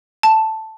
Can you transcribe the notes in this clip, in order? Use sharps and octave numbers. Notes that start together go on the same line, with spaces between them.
A5